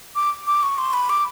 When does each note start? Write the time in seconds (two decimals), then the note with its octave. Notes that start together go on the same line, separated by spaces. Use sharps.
0.15 D6
0.47 D6
0.63 C#6
0.78 C6
0.93 B5
1.09 D6